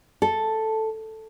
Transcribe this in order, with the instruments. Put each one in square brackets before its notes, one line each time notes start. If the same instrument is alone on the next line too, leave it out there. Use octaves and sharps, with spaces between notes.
[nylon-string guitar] A4